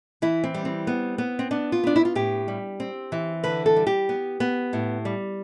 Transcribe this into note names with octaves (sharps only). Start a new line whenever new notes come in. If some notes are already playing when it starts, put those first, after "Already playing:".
E3 E4
C4
G3
C4
B3
B3
C4
B3 D4
F4
B3 D4
E4
F4
A2 G4
G3
C4
E3
D3 B4
A4
G3
G4
B3
B3
A2
G3